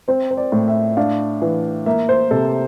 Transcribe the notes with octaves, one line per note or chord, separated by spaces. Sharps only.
C4 C5
C5
D5
A2
E5
D4 F5
E3
A#3 E5
C5
C3 A4